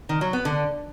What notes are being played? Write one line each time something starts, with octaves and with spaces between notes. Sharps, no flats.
D#3
F#3
B3
D3